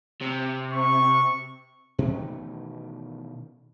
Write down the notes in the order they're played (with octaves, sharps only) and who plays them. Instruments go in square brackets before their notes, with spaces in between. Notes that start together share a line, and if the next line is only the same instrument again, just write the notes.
[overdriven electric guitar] C3
[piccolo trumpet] C#6
[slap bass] B2 D#3 E3 A3